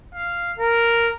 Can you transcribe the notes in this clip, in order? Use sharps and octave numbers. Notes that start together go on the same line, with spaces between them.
F5
A#4